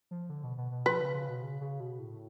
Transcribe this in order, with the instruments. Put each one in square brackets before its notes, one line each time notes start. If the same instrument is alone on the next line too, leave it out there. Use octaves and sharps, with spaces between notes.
[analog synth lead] F3
D3
B2
B2
B2
[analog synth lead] F3 [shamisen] B4
[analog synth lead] C#3
C#3
B2
C#3
C#3
B2
A2